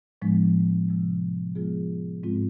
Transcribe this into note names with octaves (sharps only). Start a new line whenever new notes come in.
A2 F3 G#3 B3 D4
C3 F3 G#3
F3 G#3 B3 F4 G#4
G#2 G#3 C4 F4